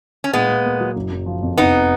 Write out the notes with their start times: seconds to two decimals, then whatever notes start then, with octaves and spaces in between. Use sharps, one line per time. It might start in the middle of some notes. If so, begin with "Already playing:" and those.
0.24 C#4
0.33 A#2 G#3 B3
0.49 A#2
0.65 A#3
0.80 F#3
0.96 F#1
1.12 F#1
1.26 F3
1.42 F2
1.58 F1 B3 D#4